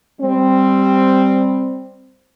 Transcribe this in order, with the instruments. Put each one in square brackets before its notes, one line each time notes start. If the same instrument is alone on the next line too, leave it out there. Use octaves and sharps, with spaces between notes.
[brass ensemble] G3 C4